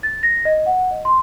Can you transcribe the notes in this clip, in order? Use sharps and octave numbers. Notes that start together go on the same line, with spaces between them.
A6
A#6
D#5
F#5
D#5
C6